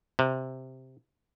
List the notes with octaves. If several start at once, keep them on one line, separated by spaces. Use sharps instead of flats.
C3